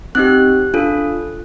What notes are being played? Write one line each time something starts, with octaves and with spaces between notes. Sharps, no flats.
C4 D#4 G4 F#6
D4 F4 A4